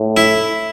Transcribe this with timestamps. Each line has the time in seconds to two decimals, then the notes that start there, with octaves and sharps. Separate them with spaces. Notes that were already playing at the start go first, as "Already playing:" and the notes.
Already playing: A2
0.17 E4